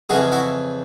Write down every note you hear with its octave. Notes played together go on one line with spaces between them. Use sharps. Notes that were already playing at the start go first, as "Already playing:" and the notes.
F2 C#3 E3 F#4 G#4
E4 F#4